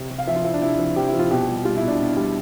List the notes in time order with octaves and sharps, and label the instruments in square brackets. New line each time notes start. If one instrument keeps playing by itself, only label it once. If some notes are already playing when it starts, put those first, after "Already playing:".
Already playing: [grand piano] C3
C3
F5
F3 E5
F4
F3 E4
D4
C3 E4
F3
C3 G4
E4
F3
F4
B2 G4
G3
G3 F4
E4
B2
D4
B2
G3